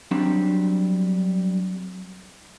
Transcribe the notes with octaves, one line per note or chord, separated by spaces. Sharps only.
F#3 G3 C4 D4